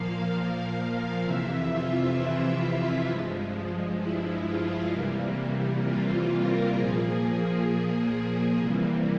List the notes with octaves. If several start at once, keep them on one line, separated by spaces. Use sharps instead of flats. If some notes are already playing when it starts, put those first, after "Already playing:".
Already playing: A#2 F3 A#3 F5
F2 C3 E3 E5
F4
E4
G2 F3 G#3
E4
F4
C3 E3 G3 A#3
F4
A#4
A#2 F3 A#3 G#4
G#4
G#4
C3 E3 G3 A#3